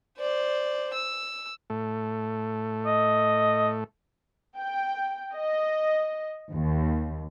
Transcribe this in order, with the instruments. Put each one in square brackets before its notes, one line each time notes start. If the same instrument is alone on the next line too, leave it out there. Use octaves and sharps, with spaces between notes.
[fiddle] C5 D5
E6
[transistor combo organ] A2 A3
[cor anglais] D#5
[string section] G5
D#5
D#2